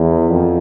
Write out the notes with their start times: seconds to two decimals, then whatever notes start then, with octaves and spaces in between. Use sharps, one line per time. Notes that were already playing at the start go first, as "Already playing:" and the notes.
Already playing: E2
0.30 F2